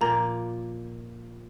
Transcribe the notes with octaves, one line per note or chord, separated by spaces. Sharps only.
A#2 F3 A#3 F4 A#5